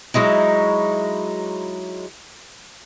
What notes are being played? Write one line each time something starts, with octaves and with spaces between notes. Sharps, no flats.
F#3 G#3 D#4 E4